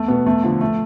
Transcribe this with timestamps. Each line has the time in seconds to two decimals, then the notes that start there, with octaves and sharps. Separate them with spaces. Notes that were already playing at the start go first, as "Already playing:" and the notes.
Already playing: E2 A3
0.08 B2 B3
0.26 E2 A3
0.44 D3 F3
0.61 A3